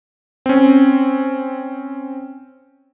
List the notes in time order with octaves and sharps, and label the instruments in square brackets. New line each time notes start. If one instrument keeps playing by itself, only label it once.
[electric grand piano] C4 C#4